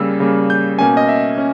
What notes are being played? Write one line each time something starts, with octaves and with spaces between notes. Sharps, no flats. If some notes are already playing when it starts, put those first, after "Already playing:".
Already playing: C#3 G3 A#3 E6
C#3 G3 A#3
G6
B2 A#3 C#4 G#5
D#5
E5
C#4